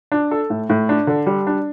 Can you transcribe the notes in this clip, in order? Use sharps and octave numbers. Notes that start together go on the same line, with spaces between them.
D4
A4
A2
A2
D4
D3
G3
D4